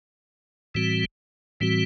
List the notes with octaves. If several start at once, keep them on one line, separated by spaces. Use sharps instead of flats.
A2 E3 G3 C4 F#4
A2 E3 G3 C4 F#4